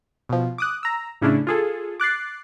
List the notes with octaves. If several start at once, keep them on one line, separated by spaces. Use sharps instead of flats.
B2 F3
D6 D#6 F#6
A#5 E6
A2 C#3 C#4 D4 E4
F4 G#4 A4
D6 F#6 A6 C7